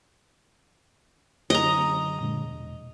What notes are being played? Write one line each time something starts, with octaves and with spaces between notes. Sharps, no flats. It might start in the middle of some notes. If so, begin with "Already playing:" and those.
F#2 D3 D#5 A#5
A#2 D3 G#3
E1